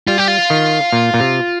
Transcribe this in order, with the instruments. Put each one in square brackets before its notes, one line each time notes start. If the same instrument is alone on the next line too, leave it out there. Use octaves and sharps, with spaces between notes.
[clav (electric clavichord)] G3 [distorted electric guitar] F4
[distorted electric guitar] G4
F4
[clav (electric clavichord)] D#3
A#2
A#2
C3